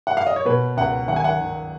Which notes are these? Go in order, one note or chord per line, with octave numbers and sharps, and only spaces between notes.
F#5
F5
D#5
C#5
B2 B4
C#2 F#5
D#3 F#5
G#5
F#5
D#3